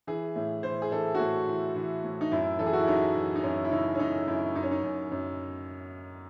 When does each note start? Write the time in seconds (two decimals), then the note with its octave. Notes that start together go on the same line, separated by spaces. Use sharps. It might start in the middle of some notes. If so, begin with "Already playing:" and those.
0.07 E3 G#4
0.36 A2
0.63 E3 C5
0.82 G#4
0.91 E3 A4
1.15 F#4
1.20 A2 G#4
1.47 E3
1.76 E3
2.04 A2
2.21 D#4
2.32 F#2 E4
2.59 E3 A4
2.66 G#4
2.73 F#4
2.80 E4
2.87 F#2 D#4
3.15 E3
3.36 D#4
3.43 F#2 C#4
3.65 E4
3.71 C#3 D#4
3.95 C#4
3.99 F#2 D#4
4.28 F#2 E4
4.55 F#2 D#4
4.63 C#4
4.71 D#4
4.83 F#2
5.12 F#2